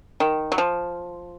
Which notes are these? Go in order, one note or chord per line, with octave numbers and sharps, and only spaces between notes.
D#3
F#3
F3